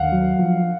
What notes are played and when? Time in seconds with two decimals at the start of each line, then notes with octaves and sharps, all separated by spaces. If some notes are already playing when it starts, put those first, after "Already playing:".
Already playing: D#2 F5 F#5
0.12 F#3
0.39 F3